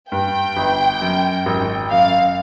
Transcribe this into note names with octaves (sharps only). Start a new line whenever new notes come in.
G2 G5
G1
F#2
G#1
F#2 F5